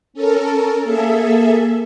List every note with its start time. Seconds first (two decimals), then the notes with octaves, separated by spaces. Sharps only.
0.14 C#4 A4 A#4
0.83 A#3 G#4 A4 E5